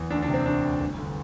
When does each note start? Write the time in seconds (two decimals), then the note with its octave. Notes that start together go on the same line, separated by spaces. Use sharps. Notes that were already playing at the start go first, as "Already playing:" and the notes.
Already playing: E2
0.10 D2 D4
0.22 D4
0.28 C3
0.34 C4
0.46 D2 D4
0.63 D2
0.80 G1
0.98 D3